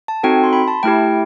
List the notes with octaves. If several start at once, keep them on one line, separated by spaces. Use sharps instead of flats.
A5
C4 D#4 F#4 A4 G5
C6
B5
A5
A3 E4 G4 G5